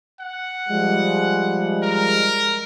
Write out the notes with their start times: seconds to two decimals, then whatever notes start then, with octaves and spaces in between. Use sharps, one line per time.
0.21 F#5
0.68 F3 G3 G#3
1.83 A#4